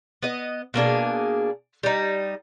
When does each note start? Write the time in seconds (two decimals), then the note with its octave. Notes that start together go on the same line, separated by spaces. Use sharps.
0.22 B3 D#5
0.74 B2 A#3 D4 G#4
1.83 G3 D#4